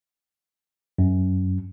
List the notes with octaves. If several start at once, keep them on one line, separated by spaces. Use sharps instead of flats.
F#2